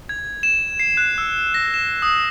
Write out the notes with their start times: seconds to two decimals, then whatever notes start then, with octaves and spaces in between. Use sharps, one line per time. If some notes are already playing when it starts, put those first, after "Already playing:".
0.09 G#6
0.43 E7
0.79 C7
0.97 F#6
1.18 E6
1.54 A#6
1.74 E7
2.02 D#6